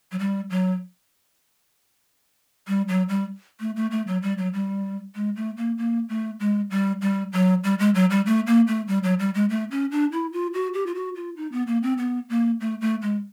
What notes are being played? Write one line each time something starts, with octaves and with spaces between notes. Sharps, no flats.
F#3
G3
F#3
G3
F#3
G3
A3
A3
A3
F#3
G3
F#3
G3
G#3
A3
A#3
A#3
A3
G#3
G3
G3
F#3
G3
G#3
F#3
G3
A3
A#3
A3
G3
F#3
G3
G#3
A3
C#4
D4
E4
F4
F#4
G4
F4
F#4
F4
D#4
B3
A#3
C4
B3
A#3
A3
A3
G#3